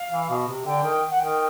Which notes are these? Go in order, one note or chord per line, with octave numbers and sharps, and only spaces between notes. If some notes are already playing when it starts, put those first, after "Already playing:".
Already playing: F5
E3
B2
C3
D3 G5
D#3
F#5
D#3 G5